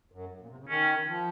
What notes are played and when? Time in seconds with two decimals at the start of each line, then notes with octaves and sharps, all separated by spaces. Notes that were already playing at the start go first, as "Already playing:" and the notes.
0.12 F#2
0.40 A#2
0.49 C3
0.59 C#3
0.68 D#3 C#4
1.06 F3